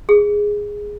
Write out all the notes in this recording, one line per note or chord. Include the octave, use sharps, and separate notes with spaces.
G#4